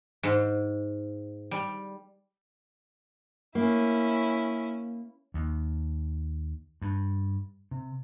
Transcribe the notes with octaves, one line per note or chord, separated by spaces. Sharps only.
G#2
G3
A#3 C#4 E4
D#2
G2
C3